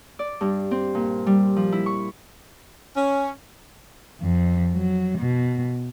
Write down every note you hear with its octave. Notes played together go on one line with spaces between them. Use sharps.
D5
G2
C4
A#2
G3
F3
E4
C#6
C#4
F2
F#3
B2